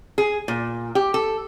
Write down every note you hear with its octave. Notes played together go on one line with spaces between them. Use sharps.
G#4
A#2
G4
A4